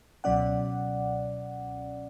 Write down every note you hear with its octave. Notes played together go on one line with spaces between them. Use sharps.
C#2 B2 F#3 C#4 D5 F#5